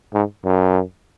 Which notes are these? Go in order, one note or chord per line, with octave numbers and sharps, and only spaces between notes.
G#2
F#2